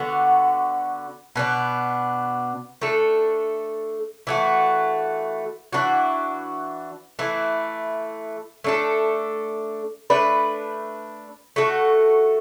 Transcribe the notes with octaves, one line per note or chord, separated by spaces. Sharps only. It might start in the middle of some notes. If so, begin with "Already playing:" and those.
Already playing: D3 B3 F#4
B2 B3 D4
A3 D4 A4
E3 A3 F#4
E3 D4 F#4
E3 A3 E4
A3 D4 A4
A3 D4 B4
A3 F#4 A4